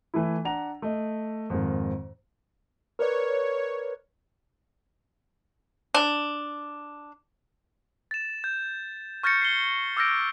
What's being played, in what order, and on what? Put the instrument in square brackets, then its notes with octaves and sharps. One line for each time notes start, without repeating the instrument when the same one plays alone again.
[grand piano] E3 A3 E4
D4 F#5 A#5 F7
A3 D#5
F2 G#2 D#3
[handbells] A#4 B4 D5 [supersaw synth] C#5
[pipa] D4
[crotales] A6 E7
G6
C#6 F6 G6 A6 A#6 C#7
C7 G7
C#7
D6 E6 F6 G6 A#6 D7